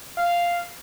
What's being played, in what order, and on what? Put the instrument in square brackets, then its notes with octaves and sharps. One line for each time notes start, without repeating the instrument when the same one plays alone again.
[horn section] F5